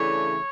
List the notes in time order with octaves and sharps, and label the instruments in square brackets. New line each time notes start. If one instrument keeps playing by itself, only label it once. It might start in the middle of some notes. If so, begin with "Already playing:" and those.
Already playing: [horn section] C#3 E3 A3 D4 C#5